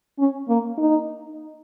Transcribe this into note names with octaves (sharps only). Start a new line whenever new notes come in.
C#4
A#3
D#4